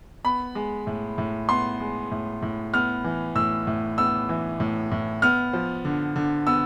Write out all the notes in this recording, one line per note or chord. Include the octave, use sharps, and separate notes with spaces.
B3 B5
G#3
A2
A2
B3 C6
G#3
A2
A2
B3 F6
E3
A2 E6
A2
B3 E6
E3
A2
A2
B3 F6
F3
D3
D3
B3 E6